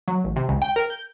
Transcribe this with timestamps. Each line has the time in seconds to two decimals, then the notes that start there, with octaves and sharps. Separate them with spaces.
0.08 F#3
0.24 A1
0.36 C3
0.49 C#2
0.62 G5
0.76 A#4
0.90 G6